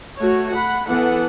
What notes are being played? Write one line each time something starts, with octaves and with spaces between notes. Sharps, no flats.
A3 F#4 C#5
F#5 B5
E3 B3 A4 F#5